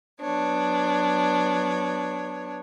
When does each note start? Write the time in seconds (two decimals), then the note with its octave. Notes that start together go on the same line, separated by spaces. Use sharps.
0.21 F#3 B3 D4 C#5